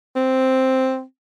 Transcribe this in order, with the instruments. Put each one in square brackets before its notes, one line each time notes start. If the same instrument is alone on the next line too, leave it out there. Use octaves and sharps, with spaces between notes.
[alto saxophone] C4